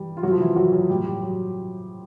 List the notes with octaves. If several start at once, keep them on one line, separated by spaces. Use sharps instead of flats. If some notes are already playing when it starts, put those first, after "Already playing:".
Already playing: E3 G3
F4
C3 D#3 F#3 G3 F#4
F3 F4
E3 E4
F#3 F#4
F#3 F#4
A2 F3 G3 G4
G3 G4
F#3